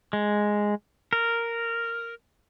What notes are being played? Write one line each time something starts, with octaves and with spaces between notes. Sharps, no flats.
G#3
A#4